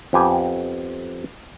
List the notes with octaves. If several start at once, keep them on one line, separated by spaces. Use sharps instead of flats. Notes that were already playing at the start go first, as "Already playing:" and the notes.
F2 B3 G4 G#5